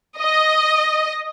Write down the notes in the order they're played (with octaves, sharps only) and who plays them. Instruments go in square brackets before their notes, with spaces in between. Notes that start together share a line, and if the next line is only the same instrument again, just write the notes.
[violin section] D#5